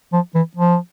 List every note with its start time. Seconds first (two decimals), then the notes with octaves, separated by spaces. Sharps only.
0.13 F3
0.35 E3
0.57 F3